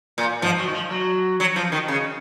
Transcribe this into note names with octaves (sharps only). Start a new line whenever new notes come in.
A#2
G#2 F3
F#3
D#3
F3
F#3
F#3
F3
D#3
C#3